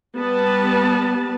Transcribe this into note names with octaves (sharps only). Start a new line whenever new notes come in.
G3 B3 B4 A5